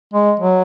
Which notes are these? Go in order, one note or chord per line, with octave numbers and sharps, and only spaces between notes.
G#3
F#3